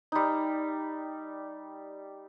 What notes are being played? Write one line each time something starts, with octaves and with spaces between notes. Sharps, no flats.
G3 D#4